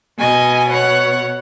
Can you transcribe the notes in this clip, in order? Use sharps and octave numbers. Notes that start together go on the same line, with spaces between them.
B2 B3 D#5 G#5
C#5 F#5